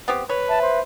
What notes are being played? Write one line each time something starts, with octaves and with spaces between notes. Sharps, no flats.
B3 C4 G4
B4 C#5
E5 A5
C5